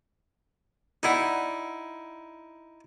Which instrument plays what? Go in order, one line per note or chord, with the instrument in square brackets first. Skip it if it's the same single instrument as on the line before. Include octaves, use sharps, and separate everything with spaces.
[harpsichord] D#4 E4 [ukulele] D5 F#5